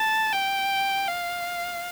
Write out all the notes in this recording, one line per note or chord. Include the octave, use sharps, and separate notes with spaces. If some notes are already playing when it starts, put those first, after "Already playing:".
Already playing: A5
G5
F5